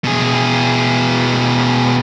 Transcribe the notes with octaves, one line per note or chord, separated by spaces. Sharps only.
B2 G#4